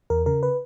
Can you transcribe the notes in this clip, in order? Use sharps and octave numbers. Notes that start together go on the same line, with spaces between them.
E2 A#4
C#3 A#4
B4